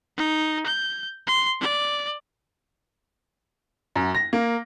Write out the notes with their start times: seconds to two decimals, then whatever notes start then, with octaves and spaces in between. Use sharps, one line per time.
0.17 D#4
0.66 G6
1.27 C6
1.61 D5
3.96 F#2
4.15 A#6
4.33 A#3